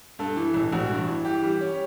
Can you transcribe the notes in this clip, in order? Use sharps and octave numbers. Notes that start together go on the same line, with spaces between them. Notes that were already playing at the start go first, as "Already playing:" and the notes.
G2 A4
E3
A1
A1 F#4
G2
E3
E3 G4
G3
C#4